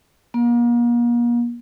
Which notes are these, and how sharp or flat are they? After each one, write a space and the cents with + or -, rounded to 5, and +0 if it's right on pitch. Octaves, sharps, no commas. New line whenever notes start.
A#3 +40